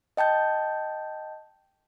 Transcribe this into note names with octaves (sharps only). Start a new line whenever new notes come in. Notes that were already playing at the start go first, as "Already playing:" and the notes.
D#5 G5 A5 G6